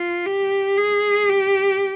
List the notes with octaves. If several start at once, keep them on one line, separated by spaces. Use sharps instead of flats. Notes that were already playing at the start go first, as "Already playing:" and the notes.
Already playing: F4
G4
G#4
G4